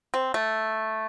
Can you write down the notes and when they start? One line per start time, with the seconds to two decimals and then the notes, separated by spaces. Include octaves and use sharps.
0.14 C4
0.34 A3